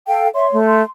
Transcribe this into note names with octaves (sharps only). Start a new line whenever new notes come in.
A4 F5 G5
C#5 E5 C6
A3
C6